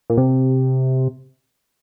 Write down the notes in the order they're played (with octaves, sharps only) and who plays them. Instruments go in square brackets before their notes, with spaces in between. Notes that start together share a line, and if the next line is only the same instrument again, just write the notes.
[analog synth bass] A#2
C3